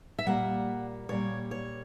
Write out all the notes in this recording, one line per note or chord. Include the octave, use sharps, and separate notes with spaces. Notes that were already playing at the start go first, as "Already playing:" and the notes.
E5
A#2 G3 A#3 F#5
A#2 G3 A#3 C#5
C#5